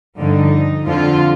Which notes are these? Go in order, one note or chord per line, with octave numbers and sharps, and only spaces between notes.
G2 D3 F3 D#4
F2 D3 F3 F4